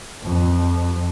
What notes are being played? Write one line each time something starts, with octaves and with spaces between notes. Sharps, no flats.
F2